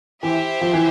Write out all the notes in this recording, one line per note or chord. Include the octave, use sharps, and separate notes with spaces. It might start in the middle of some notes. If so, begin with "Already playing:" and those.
E3 E4 G4 C5 E5
F3
E3